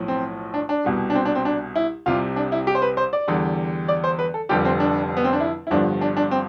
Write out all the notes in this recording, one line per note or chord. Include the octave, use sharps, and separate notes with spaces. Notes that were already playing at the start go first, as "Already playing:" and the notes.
Already playing: B1 A2 F3
C4
D4
D4
C2 B2 G3
D4
C4
D4
C4
D4
E4
C2 C3 G3 F4
D4
E4
G4
C5
B4
C5
D5
E2 D3 G3
D5
C5
B4
A4
F1 F2 D3 G3 G4
C4
D4
B3
C4
D4
E4
E4
G1 G2 D3 F3 D4
D4
D4
C4